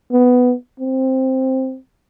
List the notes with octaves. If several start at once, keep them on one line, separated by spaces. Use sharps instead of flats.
B3
C4